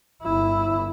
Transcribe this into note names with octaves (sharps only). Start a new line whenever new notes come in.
G1 E4